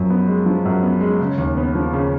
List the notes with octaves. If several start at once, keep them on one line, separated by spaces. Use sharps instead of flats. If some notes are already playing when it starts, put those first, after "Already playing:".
Already playing: F#2 F3
B3
G#3
F3
F#2
B3
G#3
C#3
D#2
B3
F3
C#3